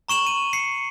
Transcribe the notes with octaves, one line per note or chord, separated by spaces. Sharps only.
A#5 C#6 E7 F#7
D#7
C7 C#7